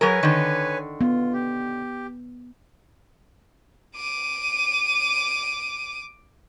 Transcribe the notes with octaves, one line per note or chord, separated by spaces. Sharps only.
F#3 G#4 A#4 B4 C#5 G#5
D3 D#3
B3 F4
G4
D6 D#7